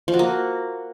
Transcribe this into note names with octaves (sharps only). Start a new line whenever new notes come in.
F3
F#4
A#3